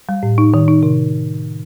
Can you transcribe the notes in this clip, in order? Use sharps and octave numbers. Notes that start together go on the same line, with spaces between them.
G3
A2
D#4
D#3
D#4
C3